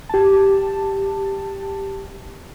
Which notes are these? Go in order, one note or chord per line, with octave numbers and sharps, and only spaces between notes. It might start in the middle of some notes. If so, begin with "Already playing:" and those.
G4 A5